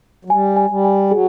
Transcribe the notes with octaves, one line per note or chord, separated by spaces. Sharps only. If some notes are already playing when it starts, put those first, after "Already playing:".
F#3
G3 G#5
G#5
G3
G#5
F#3 G#4